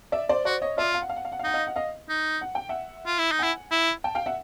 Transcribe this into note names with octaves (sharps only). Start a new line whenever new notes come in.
D5 E5
C5 D5
F#4 C5 D5
C#5 D#5
F4 D5 E5
F5
F#5
F5
F#5
F5
F#5
F5
D#4 F#5
D#5 F5
F#5
D#5 F5
D#4
F#5
G5
E5 F#5
F4
E4
D#4
E4 F#5 G#5
E4
G5 A5
F5 G5
E5 F#5